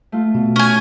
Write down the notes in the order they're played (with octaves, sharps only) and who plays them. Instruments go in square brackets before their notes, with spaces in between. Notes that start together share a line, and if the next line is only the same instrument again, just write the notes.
[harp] A3 F4
[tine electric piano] B2
[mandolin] C#4 G#5